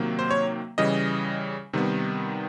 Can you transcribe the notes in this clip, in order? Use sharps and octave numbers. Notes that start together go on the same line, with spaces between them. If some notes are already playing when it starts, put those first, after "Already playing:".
Already playing: C3 D#3 F#3 A#3
C5
C#5
C#3 E3 G3 D#5
C3 D#3 G3 B3